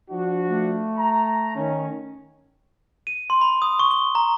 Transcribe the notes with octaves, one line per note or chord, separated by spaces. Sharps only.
F3 D4 F#4
A3
A#5
D#3 C#4
D#7
C6
B5
D#6
C#6
G7
A#5